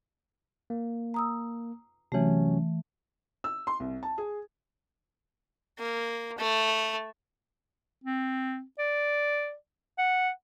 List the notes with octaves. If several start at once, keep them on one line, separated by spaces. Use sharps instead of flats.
A#3
A#5 D#6 E6
C3 E3 F#3 A3 C#4
E6
C6
C2
A5
G#4
A#3
A3
C4
D5
F#5